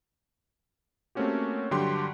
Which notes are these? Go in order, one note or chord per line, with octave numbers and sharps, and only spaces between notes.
A3 A#3 C4 C#4 F#4 G4
G2 D3 F#3 G4 C6